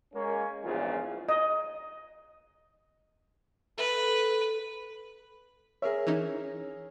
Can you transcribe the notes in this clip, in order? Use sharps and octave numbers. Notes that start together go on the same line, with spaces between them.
G#3 A#3 C#4
A#1 E2 G#2 C#3 G3 F4
D#5
A4 B4
G#4 A#4 C#5 E5
E3 C#4 D#4